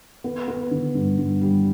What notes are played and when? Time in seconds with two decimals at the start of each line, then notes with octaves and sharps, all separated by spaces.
0.24 B3
0.48 B3
0.71 D3
0.95 G2
1.18 G2
1.41 G3